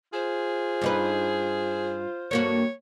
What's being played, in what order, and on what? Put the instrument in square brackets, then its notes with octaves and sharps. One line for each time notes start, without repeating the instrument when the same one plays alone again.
[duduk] F4 [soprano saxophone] G#4 [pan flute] C5
[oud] G2 D#4 B4
[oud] G2 A#3 F#4 [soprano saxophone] C#5